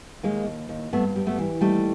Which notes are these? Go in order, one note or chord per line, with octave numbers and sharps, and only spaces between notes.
D#2 G#3 A#3
D#2
D#2
G2 A3 B3
G3
A3 B3
E3
D#2 G3 A3